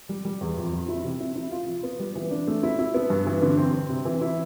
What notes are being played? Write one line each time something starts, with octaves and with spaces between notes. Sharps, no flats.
G3
G3
E2
F2
F2
E4
C3
E4
E4
F4
F3
B3
G3
E3
D4
A3
E4
E4
B3
G2
E3
D3
C4
C4
C3
E3
E4